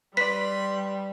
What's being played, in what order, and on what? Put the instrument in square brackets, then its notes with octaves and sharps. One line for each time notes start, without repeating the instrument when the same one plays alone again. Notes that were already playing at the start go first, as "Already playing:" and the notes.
[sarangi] G3 [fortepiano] B4 D5 [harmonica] B5 C6 [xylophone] B6